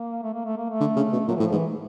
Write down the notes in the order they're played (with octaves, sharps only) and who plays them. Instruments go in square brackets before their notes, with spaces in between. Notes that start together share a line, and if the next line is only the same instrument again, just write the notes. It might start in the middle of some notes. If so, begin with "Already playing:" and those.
Already playing: [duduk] A#3
A3
A#3
A3
A#3
A3
[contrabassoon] D3
C#3
B2
[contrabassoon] A#2 [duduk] F#3
[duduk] E3
[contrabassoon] A2 [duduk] F3
[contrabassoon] G#2 [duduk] E3